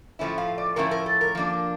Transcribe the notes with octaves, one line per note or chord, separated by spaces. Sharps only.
A2 F3 A3 C#4 E4
F5
D5
A2 F3 A3 C#4 E4 A#4
A#4
A4
A#4
F3 A#3 D4